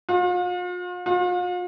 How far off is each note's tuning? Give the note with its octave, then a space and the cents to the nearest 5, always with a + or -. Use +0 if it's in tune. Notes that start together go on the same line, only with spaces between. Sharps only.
F4 +40
F4 +40